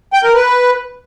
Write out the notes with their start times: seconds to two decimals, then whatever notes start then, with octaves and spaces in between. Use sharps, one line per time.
0.13 G5
0.24 A#4
0.34 B4